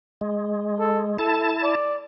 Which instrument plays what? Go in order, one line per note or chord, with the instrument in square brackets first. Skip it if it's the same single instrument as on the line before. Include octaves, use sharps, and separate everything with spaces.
[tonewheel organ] G#3
[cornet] A4
[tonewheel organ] E4 A5 [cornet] A4
[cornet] D5